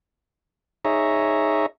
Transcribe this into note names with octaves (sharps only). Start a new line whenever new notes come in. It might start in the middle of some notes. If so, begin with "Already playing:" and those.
D#4 G#4 C#5 E5 A#5